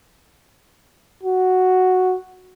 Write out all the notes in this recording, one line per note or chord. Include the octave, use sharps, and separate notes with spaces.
F#4